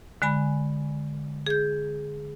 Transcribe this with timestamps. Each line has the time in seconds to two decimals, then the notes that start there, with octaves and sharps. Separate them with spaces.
0.22 D3 G#3 G#5 B5
1.46 G#4 G6